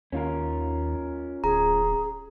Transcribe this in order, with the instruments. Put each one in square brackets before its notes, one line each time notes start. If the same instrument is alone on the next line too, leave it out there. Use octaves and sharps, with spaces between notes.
[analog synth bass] D#2 [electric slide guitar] C#4 F4 A#4
[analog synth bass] D1 [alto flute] G#4 [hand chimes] A#5